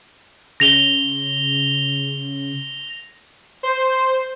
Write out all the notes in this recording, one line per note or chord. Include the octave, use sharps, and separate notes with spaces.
C#3 A#6 F7 G7
C5